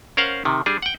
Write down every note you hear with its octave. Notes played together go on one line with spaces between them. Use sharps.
C#4 A#4 C5 F5 F#5
C3 D#3
G3 D4 G#4
F#5 G5